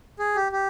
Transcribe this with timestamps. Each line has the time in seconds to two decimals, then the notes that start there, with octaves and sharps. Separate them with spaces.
0.19 G#4
0.36 G4
0.52 G4